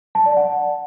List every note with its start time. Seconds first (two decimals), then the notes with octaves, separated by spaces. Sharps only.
0.15 A5
0.26 D5
0.37 F#5